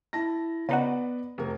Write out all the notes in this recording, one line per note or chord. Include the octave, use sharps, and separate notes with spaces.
E4 A5 A#6
C#3 B3 D#4 F#4 B4 D5
F1 A#4